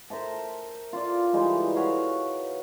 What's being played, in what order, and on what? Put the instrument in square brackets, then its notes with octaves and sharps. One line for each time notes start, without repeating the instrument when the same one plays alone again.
[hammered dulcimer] A#4 C5 E5 A5
F4 D5
E3 G3 G#3 D#4
F#4 B4 C#5 F5